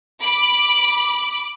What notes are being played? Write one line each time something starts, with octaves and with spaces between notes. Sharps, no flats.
B5 D6